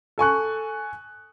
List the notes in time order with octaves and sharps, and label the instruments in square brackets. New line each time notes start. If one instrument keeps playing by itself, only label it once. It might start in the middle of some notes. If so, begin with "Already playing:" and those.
[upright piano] A4 G#5 C#6 F#6